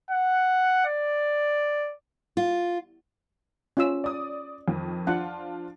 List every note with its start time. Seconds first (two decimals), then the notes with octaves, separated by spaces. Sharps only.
0.11 F#5
0.86 D5
2.37 F4
3.77 C#4 F4 E6
4.04 D5 D#6
4.68 F2 D#3
5.07 F3 D4 F4 F#5